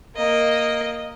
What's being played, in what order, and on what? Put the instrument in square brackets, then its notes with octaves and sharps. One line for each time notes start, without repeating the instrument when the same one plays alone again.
[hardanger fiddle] A#3 D#5